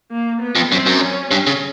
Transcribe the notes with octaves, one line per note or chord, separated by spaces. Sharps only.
A#3
B3
F2
F#2 C4
F#2
C#4
G2 C#4
C#3